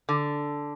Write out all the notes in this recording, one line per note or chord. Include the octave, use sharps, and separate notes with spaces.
D3